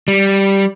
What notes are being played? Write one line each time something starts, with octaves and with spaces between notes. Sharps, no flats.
G3